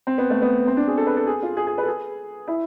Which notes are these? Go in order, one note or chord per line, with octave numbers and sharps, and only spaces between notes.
C4
B3
A3
B3
C4
D4
G#4
A4
B4
A4
G#4
F4
G#4
G#4
A4 B4
G#4
E4